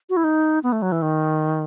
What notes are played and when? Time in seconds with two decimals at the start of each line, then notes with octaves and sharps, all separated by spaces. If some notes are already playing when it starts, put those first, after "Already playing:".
0.10 F#4
0.17 E4
0.24 D#4
0.63 B3
0.72 A3
0.82 F#3
0.92 E3
1.02 D#3